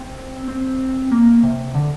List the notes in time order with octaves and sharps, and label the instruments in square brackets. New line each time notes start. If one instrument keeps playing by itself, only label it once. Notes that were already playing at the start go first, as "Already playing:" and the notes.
Already playing: [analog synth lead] C4
C4
A#3
C3
D3